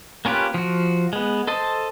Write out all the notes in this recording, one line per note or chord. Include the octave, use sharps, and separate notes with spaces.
A#3 C#4 F4 G4 B4
F3 F#4
G#3 B3
A4 C5 D#5 A5